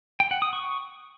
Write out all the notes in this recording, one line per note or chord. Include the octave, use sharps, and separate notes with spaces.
G5
F#5
D#6
C#6